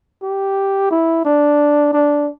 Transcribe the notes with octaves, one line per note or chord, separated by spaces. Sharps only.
G4
E4
D4
D4